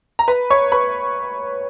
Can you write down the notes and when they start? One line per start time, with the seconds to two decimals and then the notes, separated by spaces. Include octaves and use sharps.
0.19 A#5
0.28 B4 B5
0.50 C#5 C#6
0.72 B4 B5